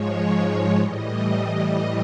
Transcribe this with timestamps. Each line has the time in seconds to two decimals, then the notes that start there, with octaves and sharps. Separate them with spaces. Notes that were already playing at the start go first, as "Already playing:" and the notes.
Already playing: G#2 F3 G#3 C#5
0.76 A2 E3 G3 D#5